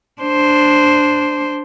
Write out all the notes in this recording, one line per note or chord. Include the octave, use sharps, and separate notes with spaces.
D4 C5